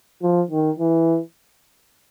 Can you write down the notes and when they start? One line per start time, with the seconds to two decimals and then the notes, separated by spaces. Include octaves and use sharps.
0.23 F3
0.51 D#3
0.79 E3